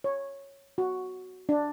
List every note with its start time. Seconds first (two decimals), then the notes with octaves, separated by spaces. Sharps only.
0.04 C#5
0.78 F#4
1.49 D4